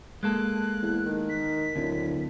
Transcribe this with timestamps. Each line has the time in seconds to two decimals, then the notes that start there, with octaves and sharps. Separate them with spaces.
0.23 G#3 A#3 A4 F#6
0.82 E2
1.06 D#3
1.29 B6
1.76 D1 D2